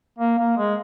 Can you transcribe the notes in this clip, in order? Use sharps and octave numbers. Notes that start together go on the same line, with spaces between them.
A#3
A#3
G#3